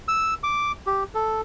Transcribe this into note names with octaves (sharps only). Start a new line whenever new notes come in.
E6
D6
G4
A4